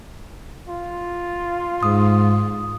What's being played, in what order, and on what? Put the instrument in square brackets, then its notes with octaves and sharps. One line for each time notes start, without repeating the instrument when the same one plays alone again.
[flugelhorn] F4
[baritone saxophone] G#2 [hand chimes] D#6